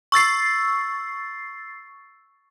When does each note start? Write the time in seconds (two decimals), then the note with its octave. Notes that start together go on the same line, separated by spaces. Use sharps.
0.12 C#6 E6 A6 C7